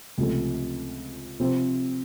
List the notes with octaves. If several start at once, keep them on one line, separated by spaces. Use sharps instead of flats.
C#2 C3 F3 A3
C3 F3 C4